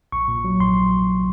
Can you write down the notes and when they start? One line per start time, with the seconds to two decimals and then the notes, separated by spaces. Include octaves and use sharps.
0.12 A#1 C#6
0.28 A#2
0.44 F#3
0.60 A#1 C6